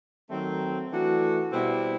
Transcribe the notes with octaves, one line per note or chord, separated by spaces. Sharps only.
D#3 F#3 A3 C4
E3 A3 D4 F#4
B2 G3 C4 E4